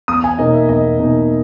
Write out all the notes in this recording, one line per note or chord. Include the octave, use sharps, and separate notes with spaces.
E2 D#6
G#5
B2 A#3 D#4 D#5
E5
E2 D#5
B2 A#3 D#4